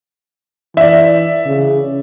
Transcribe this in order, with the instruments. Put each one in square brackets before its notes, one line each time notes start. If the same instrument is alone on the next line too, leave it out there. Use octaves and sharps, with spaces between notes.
[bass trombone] E3 [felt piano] D5 E5
[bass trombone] C#3